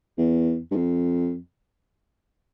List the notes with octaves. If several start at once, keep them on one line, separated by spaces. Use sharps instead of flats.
E2
G2
F2